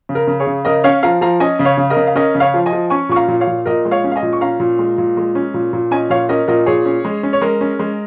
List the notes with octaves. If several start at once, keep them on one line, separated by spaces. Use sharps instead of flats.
C#3
A#4
C#3
G#4 C#5
C#3
C#3 A#4 D#5
C#4 C#5 F5
F3 F5 A#5
F3 F5 A#5
C#4 D#5 G#5
C#3
C#5 F5
C#3
A#4 D#5
C#3
F5
C#4 A#4 D#5
C#3
C#5 F5
F3
D#5 G#5
F3
C#4 G#5 C#6
A#2 C#6
F5 A#5
A#2
C#5 F5
A#2
A#2 A#4 D#5
G#3
C#5 F5
C#4
F5
D#5 G#5
A#2
C#6
C#4 F5 A#5
A#2
G#3
A#2
G#3
C#4
A#2
A#2
C#4 D#5 G#5
A#2 C#5 F5
C#4 A#4 D#5
A#2 A#4 D#5
A#2 G#4 C#5
C#4
G#3
C#4
C#5
G#3 A#4
C#4
G#3